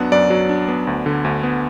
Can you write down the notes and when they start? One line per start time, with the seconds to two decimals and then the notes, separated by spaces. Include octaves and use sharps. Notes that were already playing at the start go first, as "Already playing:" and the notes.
Already playing: F#2 F#3 B3 D4 F#5
0.12 F#2 D5
0.30 F#3
0.49 D4
0.68 B3
0.87 D2
1.06 D3
1.25 D2
1.43 B3